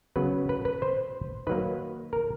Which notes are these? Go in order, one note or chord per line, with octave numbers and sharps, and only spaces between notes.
C#3 F#3 B3 B4
B4
B4
C5
D#3 F#3 A#3 B4
A#4